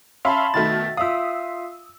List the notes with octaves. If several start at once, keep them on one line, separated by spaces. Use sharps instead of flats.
C#4 E5 F5 A5 B5 C6
B2 D#3 A3 E5 A6
F4 E5 F5 D#6 E6